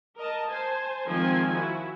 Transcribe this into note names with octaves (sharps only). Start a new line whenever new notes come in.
A#4 D#5 A5
C5 G#5 A5
D#3 F3 G#3 C4 G#5
E4 F#4